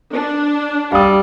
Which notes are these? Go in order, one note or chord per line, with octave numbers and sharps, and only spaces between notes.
D4
G3 F5 D#6